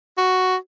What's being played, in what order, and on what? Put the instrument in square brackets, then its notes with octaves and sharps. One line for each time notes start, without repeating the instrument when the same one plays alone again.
[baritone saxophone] F#4